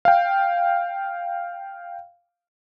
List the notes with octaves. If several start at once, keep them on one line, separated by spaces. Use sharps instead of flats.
F5 G5